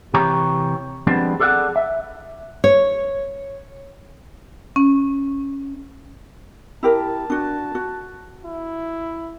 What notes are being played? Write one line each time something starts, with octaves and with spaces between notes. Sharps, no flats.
C3 E3 G4 C#5 A#5
F3 G3 G#3 B3 C4 D4
G#4 A4 D5 E5 F#5
E5
C#5
C#4
E4 G4 A#4 A5
D4 F#4
F#4
E4